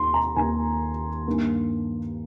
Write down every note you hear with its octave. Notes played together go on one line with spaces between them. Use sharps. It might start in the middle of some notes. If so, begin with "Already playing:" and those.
Already playing: D#2 D#3 A#3 D#4 C6
A#5
D#2 D#3 A#3 D#4 G#5
G2 D#3 A#3 D#4